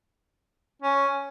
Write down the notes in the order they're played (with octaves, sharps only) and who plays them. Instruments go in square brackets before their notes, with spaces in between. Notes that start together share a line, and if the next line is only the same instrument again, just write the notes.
[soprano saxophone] C#4